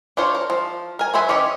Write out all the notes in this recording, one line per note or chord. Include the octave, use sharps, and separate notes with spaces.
D4 F4 C5 C#5
A#4
F3
A#4 G#5
F#3 B4 C5 E5 G#5
E3 C#4 G4 C#5 D#5